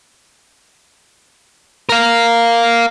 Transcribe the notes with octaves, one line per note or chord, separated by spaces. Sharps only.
A#4 F5